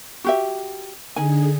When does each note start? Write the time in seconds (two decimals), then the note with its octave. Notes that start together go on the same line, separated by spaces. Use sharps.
0.24 F#4 G4 E5
1.16 D3 D#4 G#4 G#5